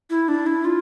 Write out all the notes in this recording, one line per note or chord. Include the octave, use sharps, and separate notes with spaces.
E4
D4
E4
F4